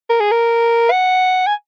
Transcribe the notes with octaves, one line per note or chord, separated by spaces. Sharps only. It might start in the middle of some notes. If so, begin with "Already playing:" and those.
A#4
G#4
A#4
F#5
G#5